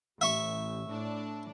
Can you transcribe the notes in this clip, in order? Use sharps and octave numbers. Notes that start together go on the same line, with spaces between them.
A1 E5 C#6
A2 D4